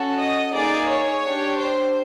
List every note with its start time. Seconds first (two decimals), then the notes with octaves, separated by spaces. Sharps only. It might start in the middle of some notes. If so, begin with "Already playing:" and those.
Already playing: C#4 F#4 A4
0.18 D#5
0.53 A#3 D#4 G#4 D5
0.88 C#5
1.24 D4 G4
1.58 C5